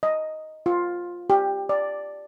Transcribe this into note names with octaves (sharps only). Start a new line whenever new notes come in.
D#5
F4
G4
D5